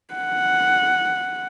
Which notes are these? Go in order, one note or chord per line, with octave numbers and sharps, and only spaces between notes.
F#5